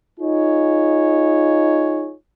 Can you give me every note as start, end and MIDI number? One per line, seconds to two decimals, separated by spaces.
0.20 2.14 63
0.20 2.14 65
0.20 2.14 68
0.20 2.14 73